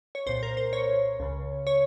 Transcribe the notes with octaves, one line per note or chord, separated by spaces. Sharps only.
C#5
C2 A#2 C5
A#4
C5
C#5
C#2 C#3
C#5